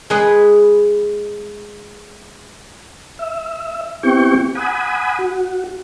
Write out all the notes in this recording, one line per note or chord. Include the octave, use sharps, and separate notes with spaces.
G#3 G#4 B4
E5
B3 C4 E4 G4 G5 C#6
F#5 G#5 B5 D#6
F#4